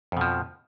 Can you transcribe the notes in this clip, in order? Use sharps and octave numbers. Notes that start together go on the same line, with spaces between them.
F2 B2 F3